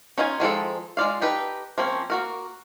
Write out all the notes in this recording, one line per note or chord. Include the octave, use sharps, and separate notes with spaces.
C#4 D#4 F4 D5 G#5
D#3 F3 G#3 A4
G#3 F4 D5 F5
D#4 G4 A4 B4
F3 A#3 C4 C#4
A#3 F#4 A#4